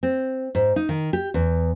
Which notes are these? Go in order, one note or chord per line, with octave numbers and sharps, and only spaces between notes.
C4
G#2
D#4
D#3
G4
E2